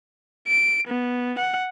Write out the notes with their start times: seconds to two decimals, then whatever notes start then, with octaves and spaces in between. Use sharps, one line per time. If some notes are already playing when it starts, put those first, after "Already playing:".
0.48 D7
0.88 B3
1.39 F#5